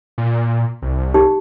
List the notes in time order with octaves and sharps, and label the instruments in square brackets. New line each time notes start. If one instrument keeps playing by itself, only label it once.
[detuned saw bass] A#2
C2
[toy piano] D#4 G4